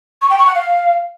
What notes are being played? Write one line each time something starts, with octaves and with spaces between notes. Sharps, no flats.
C#6
G5
C#6
F#5
F5